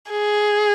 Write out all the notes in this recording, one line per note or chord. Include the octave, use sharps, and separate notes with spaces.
G#4